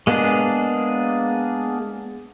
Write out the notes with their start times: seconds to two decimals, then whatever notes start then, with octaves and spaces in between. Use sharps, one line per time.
0.07 G#3 A#3 B3 D4 G#4